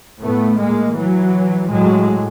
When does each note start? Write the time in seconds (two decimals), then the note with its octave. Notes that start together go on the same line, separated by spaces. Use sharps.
0.21 A2 A3 B3
0.59 G#3 A#3
0.95 E3 F#3
1.69 A2 F#3 G#3